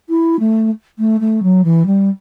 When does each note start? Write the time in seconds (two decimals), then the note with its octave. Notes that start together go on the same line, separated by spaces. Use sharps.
0.09 E4
0.40 A3
0.99 A3
1.21 A3
1.43 F#3
1.64 E3
1.86 G3